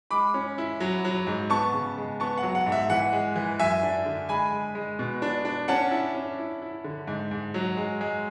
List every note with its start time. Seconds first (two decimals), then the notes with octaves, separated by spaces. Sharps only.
0.11 G#3 B5 D6
0.34 C#4
0.58 E4
0.80 F#3
1.05 F#3
1.27 G#2
1.50 B3 A5 C#6
1.73 C#3
1.97 G#3
2.20 B3 A5 C#6
2.38 F#5
2.43 F#3
2.55 F#5
2.66 G#2
2.72 E5
2.90 E3 F#5
3.13 G#3
3.36 E3
3.59 F#2 E5 G#5
3.83 D4
4.06 D3
4.29 G#3 G#5 B5
4.53 G#3
4.75 G#3
4.99 B2
5.22 D4
5.45 D4
5.68 C#4 F#5 A5
5.91 E4
6.15 C#4
6.39 E4
6.62 E4
6.84 D3
7.07 G#2
7.31 G#2
7.54 F#3
7.77 G#3
8.01 G#3